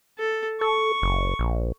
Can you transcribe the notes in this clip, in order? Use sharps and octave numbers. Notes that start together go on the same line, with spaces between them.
A4
A4 C#6
F#1
A#1